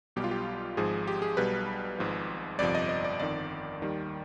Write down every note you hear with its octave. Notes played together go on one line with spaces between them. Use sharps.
B1 B2 G3 G4
F4
G4
G#1 G#2 F3 G#4
G4
G#4
B1 B2 G3 B4
G#1 G#2 F3
G1 F2 C3 F3 D5
D#5
D#5
D5
G1 F2 D#3 D5
D#2 D#3 G3